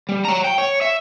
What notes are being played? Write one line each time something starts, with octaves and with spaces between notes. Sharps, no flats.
G3
C#5 A#5
G5
C#5
E5